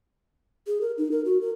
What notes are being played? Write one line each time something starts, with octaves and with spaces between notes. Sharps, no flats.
G#4
A#4
D#4
A#4
F#4
A#4